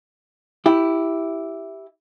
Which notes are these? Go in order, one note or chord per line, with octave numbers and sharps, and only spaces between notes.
E4 G4